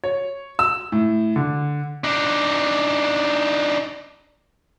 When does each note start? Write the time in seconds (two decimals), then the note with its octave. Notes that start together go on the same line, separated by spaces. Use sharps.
0.04 C#5
0.59 E6
0.92 A2
1.36 D3
2.04 D4 D#4